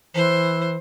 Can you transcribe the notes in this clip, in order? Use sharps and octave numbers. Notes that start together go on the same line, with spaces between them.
E3 C5